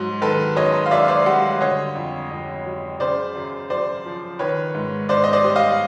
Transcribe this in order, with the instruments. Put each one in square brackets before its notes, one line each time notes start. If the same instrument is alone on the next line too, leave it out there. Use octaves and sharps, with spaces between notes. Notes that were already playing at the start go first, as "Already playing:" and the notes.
Already playing: [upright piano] G#2 F#3
D#3 A4 B4
F#2 C#5 D#5
F5
F#2 D5 E5
C5 D5
G3 E5 F#5
D3 C#5 D#5
F2
F2
F#3
C#3 C5 D5
F#2
F#2 C5 D5
F3
D#3 B4 C#5
G#2
G#2 C5 D5
D#5
C5 D5
G3
D#5 F5